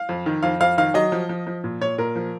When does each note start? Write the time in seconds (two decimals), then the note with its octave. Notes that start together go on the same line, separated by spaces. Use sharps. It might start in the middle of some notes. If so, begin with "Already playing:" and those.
Already playing: F5
0.09 F2
0.26 D#3
0.43 F2 F5
0.60 F2 F5
0.78 D#3 F5
0.94 F#3 D#5
1.12 F3
1.29 F3
1.47 F3
1.64 A#2
1.81 A#2 C#5
1.98 A#2 A#4
2.16 F3